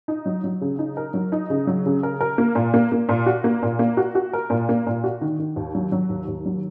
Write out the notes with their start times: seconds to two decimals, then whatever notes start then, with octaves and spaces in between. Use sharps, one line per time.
0.08 D#4
0.26 F#3
0.44 F#3
0.61 C#3
0.79 D#4
0.97 A#4
1.14 F#3
1.32 D#4
1.50 C#3
1.67 F#3
1.86 C#3
2.03 A#4
2.21 A#4
2.38 A#3
2.55 A#2
2.74 A#3
2.92 A#3
3.09 A#2
3.26 F#4
3.44 A#3
3.62 A#2
3.79 A#3
3.97 F#4
4.15 F#4
4.33 A#4
4.50 A#2
4.69 A#3
4.87 A#2
5.04 F#4
5.21 D#3
5.39 D#3
5.56 D#2
5.75 F#3
5.92 F#3
6.09 D#2
6.28 D#2
6.46 F#3